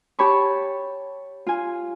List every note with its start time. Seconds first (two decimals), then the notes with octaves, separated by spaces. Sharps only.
0.19 G4 C#5 A5 B5 C#6
1.47 F4 G#5